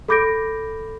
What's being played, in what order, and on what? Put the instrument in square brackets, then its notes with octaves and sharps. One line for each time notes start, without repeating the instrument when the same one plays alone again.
[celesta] A4 B5 D6 G6 A#6 D7